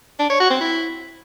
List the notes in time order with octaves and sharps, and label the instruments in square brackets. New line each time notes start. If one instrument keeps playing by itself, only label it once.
[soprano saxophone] D4
C#5
F#4
C4
E4